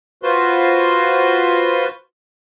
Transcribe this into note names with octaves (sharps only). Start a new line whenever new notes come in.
F4 F#4 B4 C5 C6